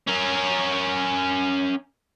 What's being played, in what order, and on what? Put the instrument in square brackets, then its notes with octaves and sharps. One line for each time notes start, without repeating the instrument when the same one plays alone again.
[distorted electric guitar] C#4 A#4